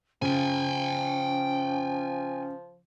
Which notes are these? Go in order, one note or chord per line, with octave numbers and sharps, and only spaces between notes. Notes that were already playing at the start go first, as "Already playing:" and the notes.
C#3 F3 C#4 G5 G#5